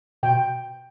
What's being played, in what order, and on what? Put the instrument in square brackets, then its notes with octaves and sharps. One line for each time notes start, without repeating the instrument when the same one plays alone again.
[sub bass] B2 [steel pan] G5